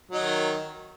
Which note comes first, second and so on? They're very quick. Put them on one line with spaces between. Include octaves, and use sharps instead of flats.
F#3 D#4 D#3